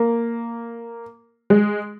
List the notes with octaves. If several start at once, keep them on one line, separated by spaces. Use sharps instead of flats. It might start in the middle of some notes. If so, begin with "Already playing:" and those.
Already playing: A#3
G#3